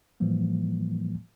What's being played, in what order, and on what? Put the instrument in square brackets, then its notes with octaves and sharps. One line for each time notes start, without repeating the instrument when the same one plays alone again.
[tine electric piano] A2 E3 F3 G3 A#3